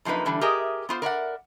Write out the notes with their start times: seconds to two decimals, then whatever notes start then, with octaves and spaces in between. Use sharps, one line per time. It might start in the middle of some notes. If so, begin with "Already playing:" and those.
0.05 F#2 F3 A#3 D#4 B4
0.25 D3 E3 G3 D4
0.41 G4 G#4 A#4 D#5 E5
0.89 B3 F4 C5
1.02 A#4 D5 E5 F#5